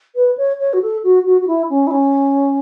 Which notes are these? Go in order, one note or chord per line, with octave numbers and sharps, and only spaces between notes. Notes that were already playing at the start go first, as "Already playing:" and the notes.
B4
C#5
C#5
F#4
A4
F#4
F#4
F#4
E4
C#4
E4
C#4